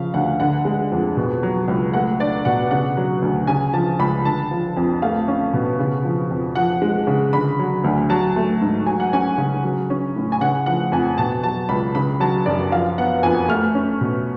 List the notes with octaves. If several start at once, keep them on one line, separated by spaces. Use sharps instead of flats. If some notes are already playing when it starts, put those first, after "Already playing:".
Already playing: C#3 F3 F5
D2 F#5
D3 F#5
G#3
F2
B2
F#3
C#2
A3 F#5
D4 D5
B2 F#5
C#3 F#5
F#3
D2
C#3 G#5
F3 A5
C#2 B5
D3 A5
F3
F2
A3 F5
C#4
B2
C#3
F3
F2
F3 F#5
G#3
C#3
D3 B5
F#3
D2
F#3 A5
A3
G#2
F#3 G#5
F#5
C#4 G#5
C#3
F#3
C#4
A2
G#5
C#3 F#5
F3 F#5
F2 G#5
B2 A5
F#3 A5
C#2 B5
C#3 B5
F#3 A5
F#2 D5
F3 F5
B3 F#5
F2 G#5
A3 F6
C#4
B2